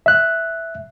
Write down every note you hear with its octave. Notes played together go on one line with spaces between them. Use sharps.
E5 F#6